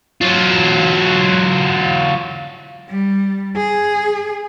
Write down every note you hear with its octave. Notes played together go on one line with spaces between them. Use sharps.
F#3 F4
G3
G#4